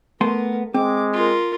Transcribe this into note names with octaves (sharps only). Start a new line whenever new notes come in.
A3 B3 A#4 C6
G#3 C4 D6
F4 A#4